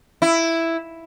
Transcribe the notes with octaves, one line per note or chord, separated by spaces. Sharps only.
E4